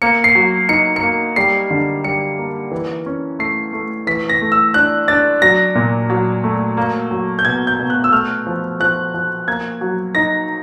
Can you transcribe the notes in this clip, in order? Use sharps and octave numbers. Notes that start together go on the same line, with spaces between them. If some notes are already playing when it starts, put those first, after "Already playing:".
A#3 C#7
C7
F#3
D#4 C#7
C#7
A#3
G3 C7
D3
G3 C#7
A#3
E3
C#4
A3 C7
A3
E3 B6
A#6
A3
E6
D4 F#6
D4 A6
F#3 A#6
A#2
F#3
A3
A#3
F#3
G6
B2 G#6
G6
B2
F#6
E6
A3 F6
F3
F3 F#6
F3
A#3 G#6
F#3
D#4 A#6